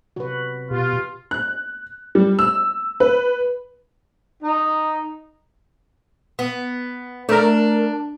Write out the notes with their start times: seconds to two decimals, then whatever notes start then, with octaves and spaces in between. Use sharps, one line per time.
0.16 C3 F#4 B4
0.71 B2 F4 G4
1.31 F#6
2.15 G3
2.39 E6
3.00 B4
4.43 D#4
6.39 B3
7.29 A3 D4 A#4